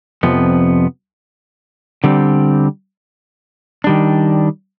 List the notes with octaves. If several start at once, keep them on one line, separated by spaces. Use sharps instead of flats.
F2 C3 F3 B3
D3 G3 C4
D#3 G3 D4